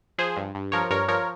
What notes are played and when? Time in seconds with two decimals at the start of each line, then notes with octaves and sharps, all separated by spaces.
0.18 F3 G#4 C5
0.37 G2
0.55 G2
0.72 F3 A#4 C#5
0.90 G2 A#4 C#5
1.08 F3 A#4 C#5